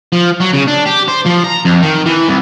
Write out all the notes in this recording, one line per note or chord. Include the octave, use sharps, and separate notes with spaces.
F3
F#3
C#3
D4
G4
C5
F3
A#5
F2
D#3
E3
C2